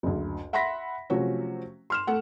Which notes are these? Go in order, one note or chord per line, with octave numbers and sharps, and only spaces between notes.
F#1 D2
E5 F#5 B5 C6 A#6 B6
C3 F3 F#3 A3 C#4 F#4
C6 F6 E7
A3 A4 F#5